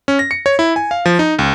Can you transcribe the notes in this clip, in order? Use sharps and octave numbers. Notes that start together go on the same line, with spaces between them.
C#4
A#6
C#7
C#5
E4
G#5
F5
F3
D#4
C#2